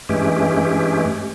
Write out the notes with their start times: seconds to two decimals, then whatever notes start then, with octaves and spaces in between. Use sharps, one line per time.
0.09 G2 E3 G#3 A3 C#4 G4